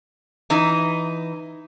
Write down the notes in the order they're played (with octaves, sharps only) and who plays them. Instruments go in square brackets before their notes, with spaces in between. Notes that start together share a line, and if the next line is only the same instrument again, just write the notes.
[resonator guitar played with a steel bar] E3 D#4